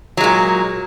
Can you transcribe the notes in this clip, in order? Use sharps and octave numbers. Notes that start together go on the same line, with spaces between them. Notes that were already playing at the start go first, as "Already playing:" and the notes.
A#2 F#3 G#3